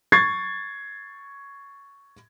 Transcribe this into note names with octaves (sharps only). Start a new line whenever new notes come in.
C#6 G#6 A6 C7